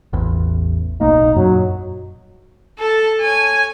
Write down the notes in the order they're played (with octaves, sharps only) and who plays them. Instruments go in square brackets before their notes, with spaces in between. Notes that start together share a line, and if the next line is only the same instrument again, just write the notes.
[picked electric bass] A1 E2
[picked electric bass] D1 B1 A#3 [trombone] D#4
[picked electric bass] F#2 A#2 [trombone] F#3
[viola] A4 A5
C#5 G#5